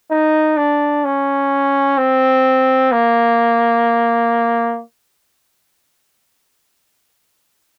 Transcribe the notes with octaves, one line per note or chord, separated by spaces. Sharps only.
D#4
D4
C#4
C4
A#3